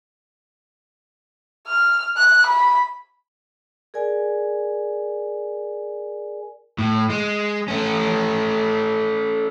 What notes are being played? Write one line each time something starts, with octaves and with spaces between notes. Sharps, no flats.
F6
F#6
B5
G#4 A#4 D5 G#5
A2
G#3
A3 C#4